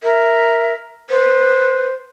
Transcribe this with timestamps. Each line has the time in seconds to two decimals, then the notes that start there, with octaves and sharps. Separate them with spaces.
0.03 A#4 E5
1.10 B4 C5